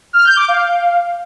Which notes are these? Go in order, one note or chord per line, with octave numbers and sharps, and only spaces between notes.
F6
G6
D6
F5